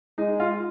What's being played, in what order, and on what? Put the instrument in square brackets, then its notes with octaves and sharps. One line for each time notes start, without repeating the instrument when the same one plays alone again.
[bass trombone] G#3 [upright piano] D#4
[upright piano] F4